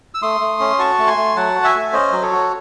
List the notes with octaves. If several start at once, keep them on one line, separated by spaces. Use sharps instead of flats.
E6
A3 C6 D#6
A3
C#4
F#4 A5 C#6
A3
G#5 C6
A3
F#3 F#5 A5
F#4
E5 G#5
A3
C#4 C5 D#5
F#3
A4 C#5
F#4